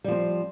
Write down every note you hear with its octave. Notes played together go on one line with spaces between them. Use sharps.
F3 G3 C4